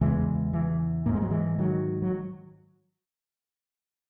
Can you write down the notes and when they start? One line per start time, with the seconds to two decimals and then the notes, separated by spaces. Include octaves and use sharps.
0.01 E2 C#3 E3 G#3
0.53 E3
1.06 G#2 A#3
1.14 G#3
1.22 F#3
1.30 E3 G#3
1.58 D#3 F#3
2.02 F#3